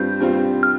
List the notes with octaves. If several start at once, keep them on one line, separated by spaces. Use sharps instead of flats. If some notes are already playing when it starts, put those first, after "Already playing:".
Already playing: G2 G3 C4 F4 G6
G2 G3 C4 F4
F6